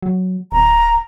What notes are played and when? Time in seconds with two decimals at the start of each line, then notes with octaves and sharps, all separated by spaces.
0.03 F#3
0.52 D1 A#5